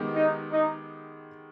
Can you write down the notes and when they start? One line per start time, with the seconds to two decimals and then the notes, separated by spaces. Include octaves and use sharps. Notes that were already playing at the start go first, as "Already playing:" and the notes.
Already playing: D#3 G#3 B3 G4
0.15 D#4
0.52 D#4